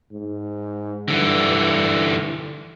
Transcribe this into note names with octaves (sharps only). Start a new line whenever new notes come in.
G#2
G2 D3 E3